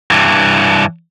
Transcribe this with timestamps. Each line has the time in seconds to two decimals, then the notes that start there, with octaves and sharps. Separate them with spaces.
0.11 G2 E3